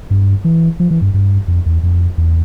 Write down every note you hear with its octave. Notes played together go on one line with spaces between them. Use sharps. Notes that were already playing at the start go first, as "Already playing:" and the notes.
G2
E3
F3
E3
G2
G2
F2
E2
F2
E2